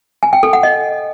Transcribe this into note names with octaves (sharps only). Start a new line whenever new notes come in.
G#5
G5
A4
F#5
D#5